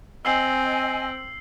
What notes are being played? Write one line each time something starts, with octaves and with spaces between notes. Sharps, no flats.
C4 D#5 G#5 E6 C7 F#7